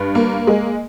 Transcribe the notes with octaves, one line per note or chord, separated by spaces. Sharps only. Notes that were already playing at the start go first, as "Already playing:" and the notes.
Already playing: G2
A#3
G#3